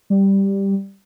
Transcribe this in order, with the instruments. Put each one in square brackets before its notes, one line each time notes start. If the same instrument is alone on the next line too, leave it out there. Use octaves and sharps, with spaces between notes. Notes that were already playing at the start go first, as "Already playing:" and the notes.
[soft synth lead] G3